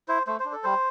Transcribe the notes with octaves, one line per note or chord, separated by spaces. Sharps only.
E4 C5
A3 C5
C5
D4
A4
G3 C5